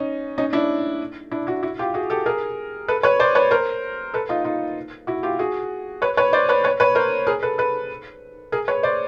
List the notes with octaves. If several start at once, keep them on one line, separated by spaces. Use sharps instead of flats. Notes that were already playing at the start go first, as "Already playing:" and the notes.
Already playing: C#4 D#4
C#4 D#4
D4 E4
D4 E4
E4 F#4
E4 F#4
F4 G4
F#4 G#4
G4 A4
G#4 A#4
A4 B4
B4 C#5
C5 D5
B4 C#5
A#4 C5
A4 B4
D#4 F4
D#4 F4
E4 F#4
F4 G4
F#4 G#4
B4 C#5
B4 C#5
C5 D5
B4 C#5
B4 C#5
B4 C#5
A#4 C5
G#4 A#4
A4 B4
A4 B4
G#4 A#4
B4 C#5
C5 D5